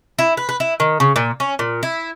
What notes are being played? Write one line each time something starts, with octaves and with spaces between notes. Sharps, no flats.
E4
B4
B4
E4
D#3
C#3
A#2
C#4
A#2
E4